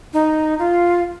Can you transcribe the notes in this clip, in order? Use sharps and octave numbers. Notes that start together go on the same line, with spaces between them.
D#4
F4